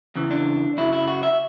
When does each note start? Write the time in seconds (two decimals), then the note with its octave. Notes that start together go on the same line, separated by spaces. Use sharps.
0.15 E2 C#3 E3
0.31 D4
0.77 F#2 C#3 F#3 E4
0.93 E4
1.08 F#4
1.23 E5